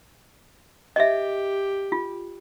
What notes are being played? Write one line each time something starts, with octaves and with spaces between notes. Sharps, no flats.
G4 D#5 E5
F4